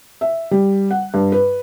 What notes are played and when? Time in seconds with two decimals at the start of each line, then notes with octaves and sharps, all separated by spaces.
0.21 E5
0.51 G3
0.91 F#5
1.14 G2
1.32 B4